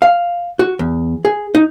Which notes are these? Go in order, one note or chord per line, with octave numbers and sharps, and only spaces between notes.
F5
F#4
E2
G#4
D#4